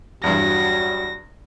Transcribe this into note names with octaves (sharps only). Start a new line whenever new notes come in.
E2 G2 F#3 G3 F#4 A#6